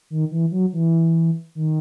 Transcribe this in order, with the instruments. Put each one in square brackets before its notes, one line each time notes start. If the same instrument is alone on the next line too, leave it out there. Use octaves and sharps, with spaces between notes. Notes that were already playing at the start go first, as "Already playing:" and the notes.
[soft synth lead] D#3
E3
F#3
E3
D#3